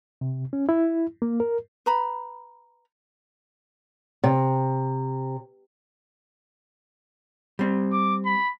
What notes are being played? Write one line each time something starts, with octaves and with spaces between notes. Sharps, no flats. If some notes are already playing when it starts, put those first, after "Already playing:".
C3
C#4
E4
A#3
A#4
B4 A#5 B5
C3
G3 C4
D6
B5